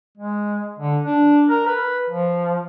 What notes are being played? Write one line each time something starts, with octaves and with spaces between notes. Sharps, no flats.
G#3
D3
D4
A#4
B4
F3